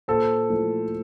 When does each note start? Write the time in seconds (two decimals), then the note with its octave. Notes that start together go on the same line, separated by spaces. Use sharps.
0.08 A#2 A4 C5
0.49 F3 A3 E4